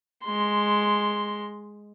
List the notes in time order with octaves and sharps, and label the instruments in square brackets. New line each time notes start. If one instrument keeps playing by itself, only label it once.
[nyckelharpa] G#3 C6